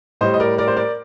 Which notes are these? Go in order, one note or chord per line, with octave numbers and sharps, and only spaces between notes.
A2 G3 C5 D#5
D#5
A#4 D5
A#4 D5
C5
A#4 D5